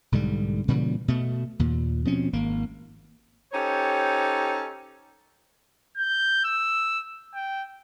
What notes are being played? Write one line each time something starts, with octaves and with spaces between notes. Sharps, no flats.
B1 G#2 D3 G3
A#2 C#3 E3 G3
B2 A3
D#2 A#2
B2 F3 C4 C#4
G#1 A#3
C#4 D#4 G4 A4 C5 C#5
G6
E6
G5